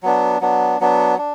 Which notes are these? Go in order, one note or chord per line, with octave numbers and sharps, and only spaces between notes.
F#3 B3 D4
F#3 B3 D4
F#3 B3 D4
D4